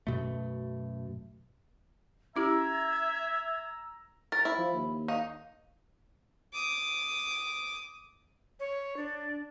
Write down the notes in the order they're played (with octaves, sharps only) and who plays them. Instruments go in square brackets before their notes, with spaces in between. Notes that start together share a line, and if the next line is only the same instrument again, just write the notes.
[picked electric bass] F#2 B2 A3
[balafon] C#4 E4 G4 [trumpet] E5 [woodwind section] A#5 E6 [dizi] G#6
[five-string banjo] A#4 [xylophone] A6
[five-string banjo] E4
[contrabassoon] F3
D#2
[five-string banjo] D#4 [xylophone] F5
[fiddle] D6 D#6
[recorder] C#5
D4